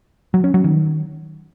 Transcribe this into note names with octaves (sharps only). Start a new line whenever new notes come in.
F#3
C#4
F#3
D#3